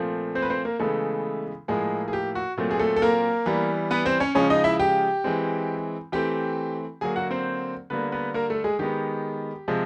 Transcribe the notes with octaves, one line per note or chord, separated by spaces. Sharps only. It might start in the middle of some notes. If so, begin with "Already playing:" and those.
Already playing: A#2 F3 A3 C4
C4 C5
B4
C4 C5
A#3 A#4
C#3 E3 G#3 A3 B3 A4
A2 F3 G#3 A#3 G#4
G#4
G4
F#4
A#2 F#3 A3 C4
G#4
A3 A4
A4
A#3 A#4
E3 G3 B3
B3 B4
C4 C5
C#4 C#5
C#3 F3 G#3 C#4 C#5
D#4 D#5
E4 E5
G4 G5
E3 G#3 C4
E3 A3 C4 G4 G5
D3 F#3 A#3 G#4 G#5
F#4 F#5
C4 C5
D3 G3 A#3 B3 B4
B3 B4
A#3 A#4
A3 A4
G#3 G#4
D#3 G#3 B3 G4
C3 F3 G#3